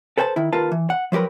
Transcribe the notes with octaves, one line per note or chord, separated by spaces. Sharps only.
A4 B4 C5 G#5 A5
D#3 E4
D#2 F4 A#4 B4 A5
E3
F#5
F3 F#3 G4 A#4 B4